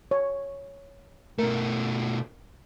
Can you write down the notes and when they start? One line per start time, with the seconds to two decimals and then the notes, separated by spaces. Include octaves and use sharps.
0.11 C#5
1.39 B2 A3 A#4